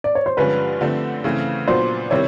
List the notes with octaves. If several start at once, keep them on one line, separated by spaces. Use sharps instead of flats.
D5
C#5
C5
G2 D3 F3 G#3 C#4 B4
D3 F3 A3 C4
C#3 E3 A3 C4
A#2 F#3 B3 D4 C5
C3 D#3 G3 C4 E4 C#5